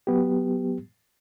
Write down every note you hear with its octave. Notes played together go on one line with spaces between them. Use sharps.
F#3 B3 G4